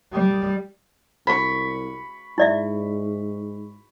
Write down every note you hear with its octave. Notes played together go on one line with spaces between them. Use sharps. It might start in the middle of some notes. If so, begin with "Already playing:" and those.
G3
C2 B5 C#6
G#2 E4 D5 E5